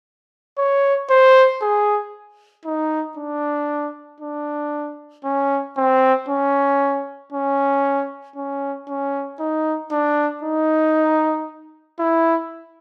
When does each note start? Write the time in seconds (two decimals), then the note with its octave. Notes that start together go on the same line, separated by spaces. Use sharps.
0.58 C#5
1.10 C5
1.62 G#4
2.65 D#4
3.17 D4
4.21 D4
5.25 C#4
5.77 C4
6.29 C#4
7.32 C#4
8.36 C#4
8.88 C#4
9.40 D#4
9.92 D4
10.43 D#4
11.99 E4